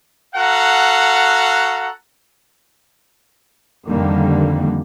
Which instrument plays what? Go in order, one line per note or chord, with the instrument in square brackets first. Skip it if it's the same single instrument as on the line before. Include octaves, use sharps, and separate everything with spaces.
[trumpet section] F#4 A4 F5 F#5 A#5
[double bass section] F2 D3 D#3 G3 A#3